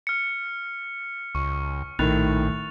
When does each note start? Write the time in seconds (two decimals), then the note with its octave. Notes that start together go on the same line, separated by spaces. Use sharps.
0.07 F6 C#7
1.35 C#2 C#6
1.99 A#1 A2 D#3 F#6 A6 F7